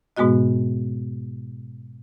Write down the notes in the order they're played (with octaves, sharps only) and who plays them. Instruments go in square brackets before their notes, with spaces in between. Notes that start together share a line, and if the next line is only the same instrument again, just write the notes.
[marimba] G#2 B2 G#3 B3 F#4 D#5